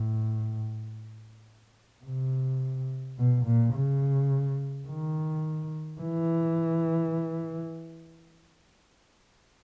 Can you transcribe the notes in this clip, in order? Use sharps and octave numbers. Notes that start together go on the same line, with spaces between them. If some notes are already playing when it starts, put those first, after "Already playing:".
Already playing: A2
C3
B2
A#2
C#3
D#3
E3